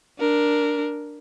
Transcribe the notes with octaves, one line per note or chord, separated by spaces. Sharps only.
D4 A#4